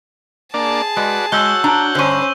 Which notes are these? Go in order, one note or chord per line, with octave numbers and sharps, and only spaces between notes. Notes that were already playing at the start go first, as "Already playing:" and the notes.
A#3 D4 G#4 D5 A5
G#3 F#4 B4 D5
G#3 F#4 C#5 E6 G6 G7
D4 A#5
G2 D3 C#4 C5 C#6 G6